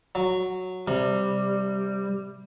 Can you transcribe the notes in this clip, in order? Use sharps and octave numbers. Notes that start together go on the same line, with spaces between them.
F#3
C3 G3